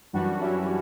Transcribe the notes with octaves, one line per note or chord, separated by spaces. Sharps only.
F#2 E3 G3 D4 F#4
C#4 E4